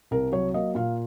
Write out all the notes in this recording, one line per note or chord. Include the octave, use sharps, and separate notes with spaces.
C2 A#4
F#3 C#5
A#3 D#5
A#2 F5